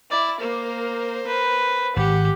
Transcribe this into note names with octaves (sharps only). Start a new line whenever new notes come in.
E4 D5
A#3 A#4 C5
B4
G#1 G4 F#5